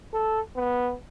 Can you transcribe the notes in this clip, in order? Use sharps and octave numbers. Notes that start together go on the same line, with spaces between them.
A4
B3